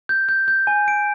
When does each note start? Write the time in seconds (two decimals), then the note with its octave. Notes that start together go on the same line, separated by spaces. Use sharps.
0.09 G6
0.29 G6
0.48 G6
0.67 G#5
0.88 D7